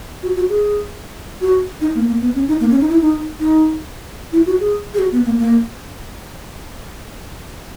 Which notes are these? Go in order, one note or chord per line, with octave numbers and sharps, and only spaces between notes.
F#4
F#4
G#4
F#4
D#4
A#3
A#3
B3
C#4
D#4
A#3
C#4
D#4
E4
D#4
D#4
E4
F#4
G#4
G#4
F#4
B3
A#3
A#3